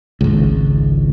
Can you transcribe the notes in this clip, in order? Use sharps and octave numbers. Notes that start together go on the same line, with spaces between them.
G#1 C#2